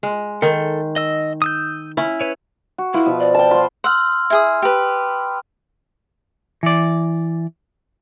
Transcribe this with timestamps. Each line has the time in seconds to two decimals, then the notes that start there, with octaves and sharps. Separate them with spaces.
0.03 G#3
0.42 D#3 A4
0.96 D#5 E6
1.42 D#6 E6 G6
1.97 C#4 E4
2.21 B4 C#5
2.78 F#4
2.94 E4 F4 B4 E5
3.06 B2 F3
3.19 D5
3.34 G5 A5
3.51 F4 C5 B5
3.84 F#5 C6 E6 F6
4.30 E4 G#4 D#6
4.62 G4 B4
6.63 E3 D5